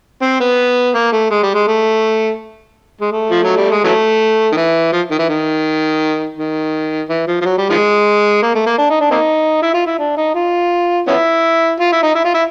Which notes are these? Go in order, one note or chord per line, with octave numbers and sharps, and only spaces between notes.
C4
B3
A#3
A3
G#3
G3
G#3
A3
G#3
A3
F3
F#3
G3
G#3
E3 F#3 A3
D#3
E3
F3
D#3
E3
D#3
D#3
E3
F3
F3
F#3
G3
D#3 F3 G#3
A#3
A3
A#3
D4
D#4
D4
A#3 C4 D#4
E4
F4
E4
D4
D#4
F4
B3 C#4 E4
F4
E4
D#4
E4
F4
E4